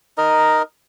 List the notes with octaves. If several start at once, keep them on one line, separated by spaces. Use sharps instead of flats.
D#4 A#4 D#5